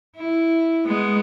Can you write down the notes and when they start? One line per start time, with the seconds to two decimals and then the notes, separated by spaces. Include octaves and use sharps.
0.16 E4
0.87 G#3 B3